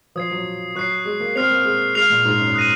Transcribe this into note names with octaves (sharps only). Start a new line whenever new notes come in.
F3 D#6 G#6 C7
F#3
F#3 C#6 F#6 C7
G#3
A#3
C4 F6 C7 F7
A#3
G#3
G#3 F6 C7 F7
A#2
G#2
F#2
D#6 F#6 A#6 D#7